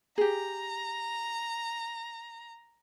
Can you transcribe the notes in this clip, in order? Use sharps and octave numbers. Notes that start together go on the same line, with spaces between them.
G4 G#4 A#5